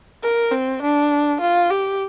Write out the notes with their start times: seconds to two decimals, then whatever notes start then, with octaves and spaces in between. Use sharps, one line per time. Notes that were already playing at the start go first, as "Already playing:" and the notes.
0.23 A#4
0.52 C4
0.82 D4
1.41 F4
1.70 G4